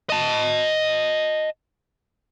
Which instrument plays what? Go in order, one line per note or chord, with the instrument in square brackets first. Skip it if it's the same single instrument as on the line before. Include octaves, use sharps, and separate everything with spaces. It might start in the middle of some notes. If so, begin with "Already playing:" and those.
[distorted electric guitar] D#5 A5